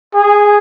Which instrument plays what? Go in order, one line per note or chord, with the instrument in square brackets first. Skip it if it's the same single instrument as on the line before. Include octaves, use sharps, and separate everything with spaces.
[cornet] G#4